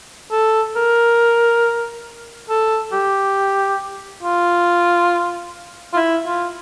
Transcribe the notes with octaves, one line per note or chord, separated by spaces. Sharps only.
A4
A#4
A4
G4
F4
F4
E4
F4